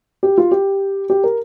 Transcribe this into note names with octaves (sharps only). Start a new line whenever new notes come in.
G4
F4
G4
G4
A#4